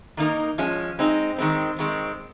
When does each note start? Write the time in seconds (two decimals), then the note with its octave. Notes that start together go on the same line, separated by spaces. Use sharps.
0.17 D#3 A#3 D#4 A#4
0.58 F3 G#3 C#4
0.99 G#3 C4 D#4
1.38 D#3 G#3 C4
1.79 D#3 G#3 C4